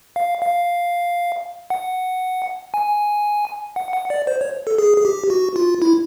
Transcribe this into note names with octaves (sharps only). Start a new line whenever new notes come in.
F5
F5
F#5
G#5
F#5
F#5
D5
C5
C#5
A4
G#4
G#4
G4
F#4
F4
E4